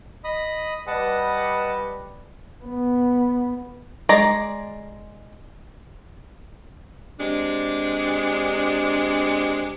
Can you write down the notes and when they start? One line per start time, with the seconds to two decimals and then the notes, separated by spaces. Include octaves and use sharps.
0.24 D#5 B5 D#6
0.87 G3 B4 D#5 F#5 A5
2.64 B3
4.09 G#3 D5 A#5
7.19 C3 G#3 D4